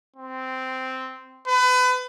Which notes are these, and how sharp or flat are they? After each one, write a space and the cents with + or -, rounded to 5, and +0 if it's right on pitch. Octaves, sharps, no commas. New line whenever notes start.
C4 -10
B4 +30